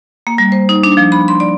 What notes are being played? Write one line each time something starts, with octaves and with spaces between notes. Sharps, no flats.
A#3
G3
C5
D#4
D4
F3
B5
C6
D5